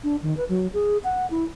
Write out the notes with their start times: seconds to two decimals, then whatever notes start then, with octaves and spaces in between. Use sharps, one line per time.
0.04 D4
0.22 D#3
0.37 B4
0.49 F#3
0.74 G#4
1.04 F#5
1.31 E4